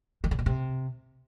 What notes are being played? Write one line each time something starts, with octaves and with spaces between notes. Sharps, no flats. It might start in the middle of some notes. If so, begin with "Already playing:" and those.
D#3
C#3
B2
C3